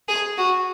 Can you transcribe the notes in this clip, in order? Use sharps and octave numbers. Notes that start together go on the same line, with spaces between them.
G#4
F#4